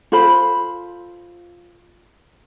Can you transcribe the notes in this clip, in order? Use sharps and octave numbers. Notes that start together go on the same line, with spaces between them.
F4 A4 C5 B5